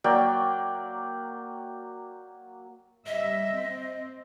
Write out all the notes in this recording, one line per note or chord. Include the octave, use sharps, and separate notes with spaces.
F#3 A#3 D5 G5
G3 D#5 E5
C4